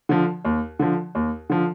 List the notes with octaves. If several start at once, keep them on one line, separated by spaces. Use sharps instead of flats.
D3 F3
D#2
D3 F3
D#2
D3 F3